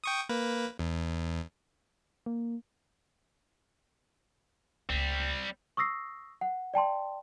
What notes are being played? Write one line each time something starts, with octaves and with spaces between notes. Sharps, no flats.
G5 C#6 D#6
A#3 B4
E2
A#3
C#2 G3 A3 C4
C#6 D#6 E6 A#6 C7
F#5
D5 G5 A5 C6